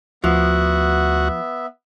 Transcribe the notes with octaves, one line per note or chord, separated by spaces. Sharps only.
D2 F3 B3 F#4 E5